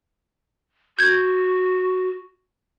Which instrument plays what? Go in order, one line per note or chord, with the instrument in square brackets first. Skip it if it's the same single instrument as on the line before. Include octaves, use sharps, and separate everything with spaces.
[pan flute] F#4 [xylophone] G6 G#6